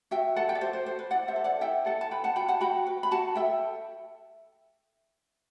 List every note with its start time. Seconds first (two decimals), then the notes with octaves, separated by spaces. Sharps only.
0.11 F#4 E5 G5
0.36 A4 F#5 A5
0.49 E5 G5
0.55 D5
0.61 F#4 C5
0.73 C5
0.86 A4 C5
0.99 B4
1.11 E4 D5 F#5
1.28 C5 E5
1.36 A4
1.44 D5 F#5
1.61 E4 E5 G5
1.86 A4 F#5 A5
2.01 A5
2.11 B4 G5 B5
2.24 F#5 A5
2.36 F#4 G5 B5
2.48 F#5 A5
2.61 F#4 G5 B5
2.87 B4
3.03 B5
3.11 F#4 F#5 A5
3.35 A4 E5 G5